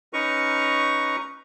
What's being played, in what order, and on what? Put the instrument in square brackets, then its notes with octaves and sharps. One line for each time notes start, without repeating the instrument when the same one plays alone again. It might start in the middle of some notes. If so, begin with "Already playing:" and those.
[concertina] C#4 D#4 B4 A#5 C#6